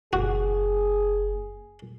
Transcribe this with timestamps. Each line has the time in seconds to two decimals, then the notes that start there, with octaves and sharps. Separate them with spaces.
0.13 F#1 A#3 F#4 G#4